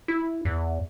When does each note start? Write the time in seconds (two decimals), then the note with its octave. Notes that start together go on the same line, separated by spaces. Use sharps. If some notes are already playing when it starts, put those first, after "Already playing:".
0.08 E4
0.45 E2